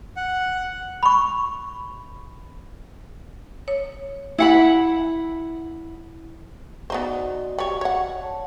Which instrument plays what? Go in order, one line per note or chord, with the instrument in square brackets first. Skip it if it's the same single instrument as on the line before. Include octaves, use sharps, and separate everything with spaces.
[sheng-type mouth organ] F#5
[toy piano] B5 C#6
[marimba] C#5
[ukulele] E4 F#5 B5
[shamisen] B3 D#4 C5 [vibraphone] F#4 D5 D#5
[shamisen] G3 C#5
C#5 F#5
[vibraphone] C#5 F#5 A5